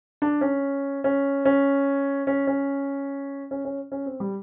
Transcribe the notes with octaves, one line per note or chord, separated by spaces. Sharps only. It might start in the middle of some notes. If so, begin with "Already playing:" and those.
D4
C#4
C#4
C#4
C#4
C#4
C#4
C#4
C#4
C4
G3